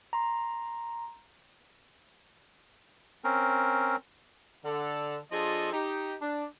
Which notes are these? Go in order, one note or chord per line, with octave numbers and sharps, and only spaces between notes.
A#5 C6
C4 C#4 A#4
D3 A4
F3 D4 F4 G#4 A4 D#5
D#4 G4
D4